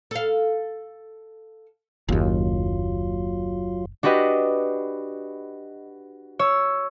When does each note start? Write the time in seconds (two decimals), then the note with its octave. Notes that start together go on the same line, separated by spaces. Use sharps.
0.11 A4 F5
2.08 F#1 D#2 F#3 F4
4.03 D4 F#4 G4 B4 D#5
6.39 C#5 E6